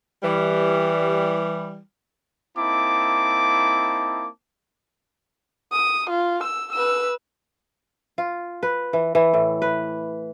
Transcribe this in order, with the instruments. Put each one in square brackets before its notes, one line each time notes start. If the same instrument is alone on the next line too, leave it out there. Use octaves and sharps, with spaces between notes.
[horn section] E3 G3
[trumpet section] A#3 C4 D#4 E4 A5 D6
[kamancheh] D#6
F4
E6
B4 E6
[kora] F4
B4
E3
E3
A2
B4